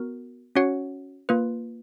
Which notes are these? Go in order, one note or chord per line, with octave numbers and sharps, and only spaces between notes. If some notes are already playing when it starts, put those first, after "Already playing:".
Already playing: B3 F#4 A#4
C#4 F#4 C#5 F#5
A#3 F4 B4